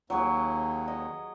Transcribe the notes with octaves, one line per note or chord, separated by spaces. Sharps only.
D#2 F#3 G#4 C#6
D#5